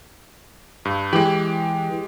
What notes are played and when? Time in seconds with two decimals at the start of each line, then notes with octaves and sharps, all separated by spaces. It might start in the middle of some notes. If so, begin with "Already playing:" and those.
0.85 G2
1.13 E3 G#3 G4